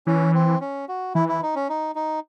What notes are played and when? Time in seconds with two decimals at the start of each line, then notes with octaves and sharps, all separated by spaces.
0.07 E3 C#4
0.34 C4
0.61 C#4
0.89 F#4
1.15 E3 E4
1.29 E4
1.43 D#4
1.56 C#4
1.69 D#4
1.95 D#4